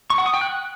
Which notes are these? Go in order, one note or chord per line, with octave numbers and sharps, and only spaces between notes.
C#6
F#5
D#6
G5
F#6